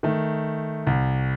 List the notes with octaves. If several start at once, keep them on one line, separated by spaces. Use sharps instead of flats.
D#3 A3
C2